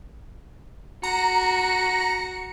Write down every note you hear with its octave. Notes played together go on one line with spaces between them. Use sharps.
F#4 A#5 C#7